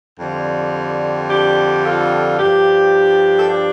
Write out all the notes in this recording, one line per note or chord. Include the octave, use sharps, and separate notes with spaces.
F2 D3 G3
D4 G4
F4 A4
G2 F3 D4 G4
A4
D4 G4